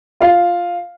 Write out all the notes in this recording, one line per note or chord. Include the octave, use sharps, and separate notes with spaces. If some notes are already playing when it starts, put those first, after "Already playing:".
F4 F5